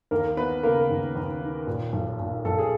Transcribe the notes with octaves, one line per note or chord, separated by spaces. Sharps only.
D#2 A#3 A#4
E3 B3 B4
C#3 A#3 A#4
D#2
D#2
E3
A#2
B1
A#2
B1 A4
G#4